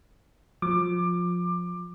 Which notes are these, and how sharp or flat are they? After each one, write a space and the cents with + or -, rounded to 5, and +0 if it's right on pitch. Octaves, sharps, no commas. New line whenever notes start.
F3 +20 D6 +20